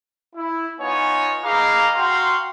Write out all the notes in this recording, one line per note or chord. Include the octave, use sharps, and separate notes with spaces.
E4
B3 D#4 F4 C#5 G#5
D#4 G#4 B4 F5 A#5 D6
F#4 F5 G5 A#5 C6